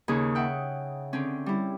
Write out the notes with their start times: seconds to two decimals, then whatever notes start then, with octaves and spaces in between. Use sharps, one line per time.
0.08 D#2 C#3 G#4 C#5
0.35 E5 F#5 G5
1.13 D3 C4 C#4
1.46 G3 E4